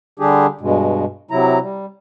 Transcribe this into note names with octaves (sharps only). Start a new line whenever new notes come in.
D3 G3 D4 G4 G#4
G2 B2 G#3
C3 F#3 E4 A#5
G3